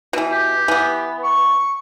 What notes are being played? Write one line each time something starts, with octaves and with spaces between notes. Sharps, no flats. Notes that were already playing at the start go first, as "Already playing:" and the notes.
B2 E3
G4
E3 B3
C#6